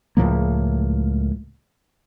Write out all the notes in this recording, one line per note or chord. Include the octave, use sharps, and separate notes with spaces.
C#2 A2 F3 A#3